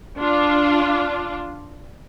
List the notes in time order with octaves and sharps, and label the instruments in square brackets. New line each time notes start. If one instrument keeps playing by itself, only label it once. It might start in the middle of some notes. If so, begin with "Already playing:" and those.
[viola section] D4 F4